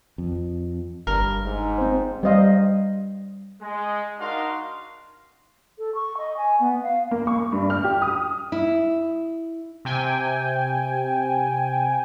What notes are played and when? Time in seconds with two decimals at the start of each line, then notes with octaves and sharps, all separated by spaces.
0.18 F2
1.07 G1 G2 A#4
1.45 G#2
1.78 C4 C5
2.23 G3 C5 D#5 F5
3.61 G#3
4.19 D4 D#4 F#4 A#4 F5 C6
5.78 A4
5.95 C#6
6.18 D#5
6.37 G#5
6.60 B3
6.83 F5
7.11 A#3
7.27 C#6
7.52 G2
7.70 F6
7.84 G4
8.02 D#6
8.52 E4
9.85 C3 G5 G#5